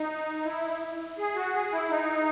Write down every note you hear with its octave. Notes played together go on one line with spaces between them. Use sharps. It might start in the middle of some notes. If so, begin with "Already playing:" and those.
Already playing: D#4
E4
G#4
F#4
G#4
E4
D#4